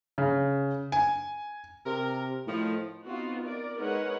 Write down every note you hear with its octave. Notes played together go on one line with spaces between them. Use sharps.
C#3
G#5
C3 A#4
A2 D#3 F3
B3 C4 D#4 F4 F#4
A#4 D5
G#3 D#4 A#4 B4 C#5 F#5